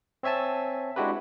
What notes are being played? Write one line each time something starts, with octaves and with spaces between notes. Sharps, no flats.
C4 C#5 E5 G#5 A5
G#3 D4 E4 F#4 G4 B4